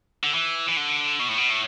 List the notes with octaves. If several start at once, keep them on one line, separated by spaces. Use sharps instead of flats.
D3
E3
E3
D3
B2
A2
B2
A2